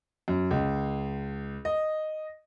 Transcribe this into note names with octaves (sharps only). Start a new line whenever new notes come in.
F#2
C#2
D#5